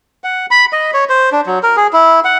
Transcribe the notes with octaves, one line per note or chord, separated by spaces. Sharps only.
F#5
B5
D#5
C#5
C5
D4
F#3
A#4
G#4
E4
F#5